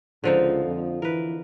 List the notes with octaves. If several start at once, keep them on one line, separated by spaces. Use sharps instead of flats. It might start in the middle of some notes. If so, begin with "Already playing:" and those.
C#2 D3 F3 D#4
F2
E3 A#4 B4